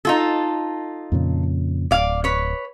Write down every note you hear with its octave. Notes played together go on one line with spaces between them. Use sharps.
D#4 F4 A4
F2 A#2 C#3
D1 D5 F5
B4 C#5